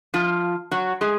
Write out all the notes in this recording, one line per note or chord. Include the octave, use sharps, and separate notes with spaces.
F3 F4
F#3 F#4
G#3 G#4